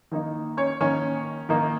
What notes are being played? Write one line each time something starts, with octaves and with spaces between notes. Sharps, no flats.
D#3 A#3 D#4
C#4 C#5
D#3 A#3 C#4 D#4 C#5
D#3 A#3 D#4